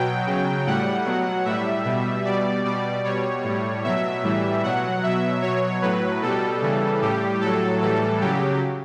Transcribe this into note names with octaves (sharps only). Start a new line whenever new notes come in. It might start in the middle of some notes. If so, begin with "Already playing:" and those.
Already playing: B2 F#3 G5
C#3 F#3
A2 G3 F#5
B2 F#3
A2 G3 E5
B2 G3
B2 G3 D5
B2 G3 D5
B2 G3 C#5
A2 G3
B2 F#3 E5
A2 E3 G3
B2 F#3 F#5
B2 F#3 E5
B2 F#3 C#5
A2 F#3 B4
B2 G3 A4
C#3 E3 G3
A2 G3 G4
A2 F#3 A4
A2 E3 G3 A4
C#3 F#3 G4